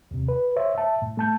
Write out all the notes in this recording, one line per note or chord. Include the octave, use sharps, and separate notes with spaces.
D#2 C3
B4
C5 C#5 E5
E5 A5
A2
A3 A5 G6